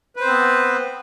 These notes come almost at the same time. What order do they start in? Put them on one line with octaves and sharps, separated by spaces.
B4 C5 C4 B3